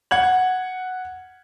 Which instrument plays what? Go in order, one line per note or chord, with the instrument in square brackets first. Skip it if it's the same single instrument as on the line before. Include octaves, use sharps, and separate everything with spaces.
[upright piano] F#5 G#6 F#7